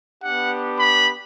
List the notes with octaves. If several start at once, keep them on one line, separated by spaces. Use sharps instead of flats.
B3 D4 G4 F#5
B5